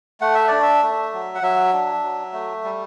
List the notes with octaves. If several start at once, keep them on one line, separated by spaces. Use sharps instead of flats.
A3 F#5
E5
D4 D5
E5
A3
F#3
F#5
F#3 E5
D4
F#3
A3
G3